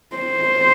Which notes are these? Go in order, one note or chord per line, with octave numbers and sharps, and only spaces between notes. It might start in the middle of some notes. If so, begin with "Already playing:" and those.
C5